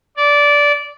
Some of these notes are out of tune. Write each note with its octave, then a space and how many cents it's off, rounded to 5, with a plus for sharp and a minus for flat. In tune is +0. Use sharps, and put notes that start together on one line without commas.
D5 -15